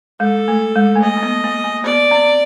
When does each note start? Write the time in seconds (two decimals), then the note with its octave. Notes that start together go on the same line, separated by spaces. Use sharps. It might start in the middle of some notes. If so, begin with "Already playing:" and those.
0.20 G#3 A4
0.48 A3
0.76 G#3
0.95 A3
1.03 A#3 D#5
1.17 A#3
1.23 B3
1.44 A#3
1.64 A#3
1.84 B3 D5
2.11 C4